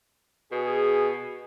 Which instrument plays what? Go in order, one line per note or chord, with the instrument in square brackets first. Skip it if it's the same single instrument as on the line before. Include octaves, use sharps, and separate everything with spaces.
[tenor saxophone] B2 [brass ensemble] G#4